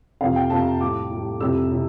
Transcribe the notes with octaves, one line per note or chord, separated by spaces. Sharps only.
F2 C3 F3 F5
G5
F2 C3 F3 A5
A#5
A2 G3 D6
A2 G3
F2 C3 E3 G3 E6
C3 E3